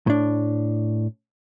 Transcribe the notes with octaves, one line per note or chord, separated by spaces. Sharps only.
A2 D4